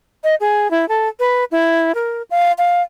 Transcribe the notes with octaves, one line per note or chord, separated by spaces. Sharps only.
D#5
G#4
E4
A4
B4
E4
A#4
F5
F5